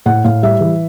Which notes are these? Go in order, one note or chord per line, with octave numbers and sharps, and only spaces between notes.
A2 F#5
A2 F5
G3 E5
E3